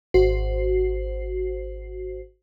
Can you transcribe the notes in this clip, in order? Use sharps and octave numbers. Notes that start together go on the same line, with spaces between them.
G#1 F#4 C5 C7